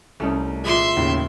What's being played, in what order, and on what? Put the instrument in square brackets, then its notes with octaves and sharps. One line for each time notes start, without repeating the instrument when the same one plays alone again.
[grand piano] C2 [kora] A3 C#4 D#4
[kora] A#2 E3 G#3 [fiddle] E5 C6
[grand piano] D#2 A2 C#3